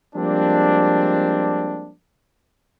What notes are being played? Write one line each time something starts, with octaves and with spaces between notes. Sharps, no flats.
F3 G3 G#3 A#3 C4 D4